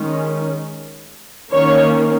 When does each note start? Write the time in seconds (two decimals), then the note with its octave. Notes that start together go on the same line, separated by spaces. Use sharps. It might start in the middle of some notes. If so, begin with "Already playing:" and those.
Already playing: D#3 G#3 C#4
1.52 D#3 A#3 C#4 C#5